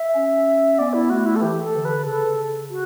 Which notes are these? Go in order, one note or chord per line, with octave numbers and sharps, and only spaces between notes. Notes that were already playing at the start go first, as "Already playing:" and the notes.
Already playing: E5
C#4
B3 D5
E4
A3 F#4
E4
A4
E3 G4
A4
D3
B4
C#3 A4
F#4